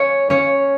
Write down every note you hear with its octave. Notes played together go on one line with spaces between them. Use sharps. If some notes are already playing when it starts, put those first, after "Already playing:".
Already playing: C#4 C#5
C#4 C#5